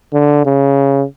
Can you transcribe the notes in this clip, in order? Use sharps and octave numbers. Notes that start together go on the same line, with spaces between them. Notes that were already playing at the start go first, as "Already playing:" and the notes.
D3
C#3